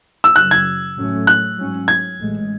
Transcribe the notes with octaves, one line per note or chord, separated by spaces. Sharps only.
E6
F#1 F#2 C#3 F#3 F#6
G#6
A1 A2 F#3 A3 C#4
F#6
G#2 F#3 C#4
G#6
A1 A2 G#3